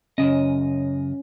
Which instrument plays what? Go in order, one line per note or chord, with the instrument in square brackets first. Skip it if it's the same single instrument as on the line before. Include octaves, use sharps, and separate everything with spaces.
[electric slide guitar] F#2 C#3 D#5 [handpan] C#4